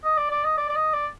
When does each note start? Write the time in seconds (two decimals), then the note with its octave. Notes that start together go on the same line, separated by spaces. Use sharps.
0.04 D#5
0.17 D5
0.31 D5
0.44 D#5
0.58 D5
0.69 D5
0.75 D#5
0.93 D5